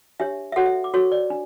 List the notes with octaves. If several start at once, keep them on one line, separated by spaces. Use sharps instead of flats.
D4 G4 C#5 E5
E5
F#4 A4 C#5 F#5
E5
D6
F#4 A4 C#5 C#6
D5
D4